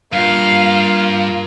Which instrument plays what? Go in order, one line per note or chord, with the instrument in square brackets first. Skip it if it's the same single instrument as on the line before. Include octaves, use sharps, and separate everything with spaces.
[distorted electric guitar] G2 [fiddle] A#3 F4 [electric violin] F5